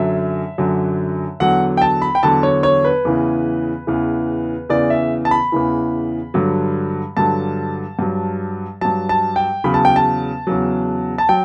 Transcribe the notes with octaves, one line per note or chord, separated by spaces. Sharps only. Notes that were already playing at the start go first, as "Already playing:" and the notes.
Already playing: F#2 D3 F#3 E5
F#2 D3 F#3
E2 D3 F#3 F#5
G5
A5
B5
G5
E2 D3 F#3 A5
C#5
C#5
B4
E2 C#3 E3
E2 C#3 E3
E2 C#3 E3 D5
E5
A5
B5
E2 C#3 E3
G2 D3 F#3
G2 D3 F#3 A5
G2 F#3
G2 F#3 A5
A5
G5
E2 C#3 F#3 B5
A5
G5
A5
E2 C#3 F#3
A5
F#3 G5